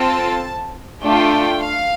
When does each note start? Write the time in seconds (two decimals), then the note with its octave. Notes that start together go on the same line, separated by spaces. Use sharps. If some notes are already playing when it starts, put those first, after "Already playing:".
Already playing: C4 F4 A4 A5
1.03 A3 D4 F4 A4 G5
1.61 F5